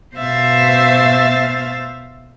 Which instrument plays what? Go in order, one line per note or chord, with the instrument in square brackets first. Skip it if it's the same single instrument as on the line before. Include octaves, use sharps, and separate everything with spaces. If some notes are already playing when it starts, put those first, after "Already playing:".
[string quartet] B2 C5 E5 F5 A6